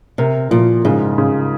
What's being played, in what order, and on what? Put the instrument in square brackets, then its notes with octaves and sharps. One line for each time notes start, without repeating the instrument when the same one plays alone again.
[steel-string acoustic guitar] C3 [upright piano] A#4
[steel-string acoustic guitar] A#2 [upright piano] F3
[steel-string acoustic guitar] G#2 [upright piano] C#3
[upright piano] C#3